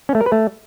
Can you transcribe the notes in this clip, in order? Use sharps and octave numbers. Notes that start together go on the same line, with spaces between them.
C#4
A3
A#4
B4
A3